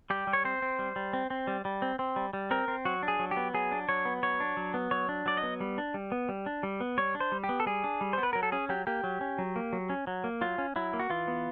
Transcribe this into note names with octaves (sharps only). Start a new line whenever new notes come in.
G3 G4
G3
C#5
C4 C5
C4
G3
G3
C4
C4
G3
G3
C4
C4
G3
G3
C4 A#4
C4
F#3 F#4
D4
G#4
F#3
G4
B3
F#3 G#4
D4
F#3 C#5
B3
F#3 C#5
D4
F#3
B3
F#3 C#5
D4
F#3 D5
D#5
B3
G3
D4
G3
B3
G3
D4
G3
B3
G3 C#5
D4
C5
G3
G4
B3
A4
G3 G#4
D4
G3
B3 C5
B4
F#3 A#4
A4
C#4 G#4
F#3 G4
A#3 G4
F#3
C#4
F#3
A#3
F#3
C#4
F#3
A#3
F#3 F4
C#4
F#3 E4
A#3
F#4
E3 F4
B3